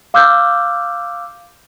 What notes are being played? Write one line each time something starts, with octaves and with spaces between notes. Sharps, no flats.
F5 D6 E6 F6 G6